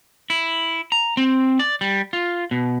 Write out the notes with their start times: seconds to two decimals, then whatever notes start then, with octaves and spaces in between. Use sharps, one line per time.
0.30 E4
0.92 A#5
1.17 C4
1.59 D5
1.81 G3
2.13 F4
2.51 B2